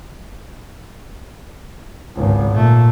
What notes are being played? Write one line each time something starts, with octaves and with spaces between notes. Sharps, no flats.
G#1 C#2
A#2 A3